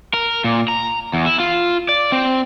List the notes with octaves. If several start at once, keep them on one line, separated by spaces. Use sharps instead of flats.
A#4
A#2
A#5
E2
E4
F4
D5
C4